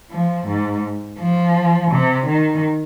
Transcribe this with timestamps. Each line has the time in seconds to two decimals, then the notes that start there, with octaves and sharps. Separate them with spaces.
0.11 F3
0.47 G#2
1.19 F3
1.91 C3
2.26 D#3